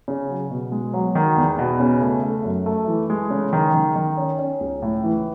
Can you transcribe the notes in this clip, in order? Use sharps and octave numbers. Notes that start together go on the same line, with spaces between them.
C#3
F#3
B2
G#3
F#3
D#3
E2
B2
C#3
A3
A3
F#2
A3
E3
G#3
C#3
D#3
D#3
D#3
C#4
C#4
C#2
A2
E3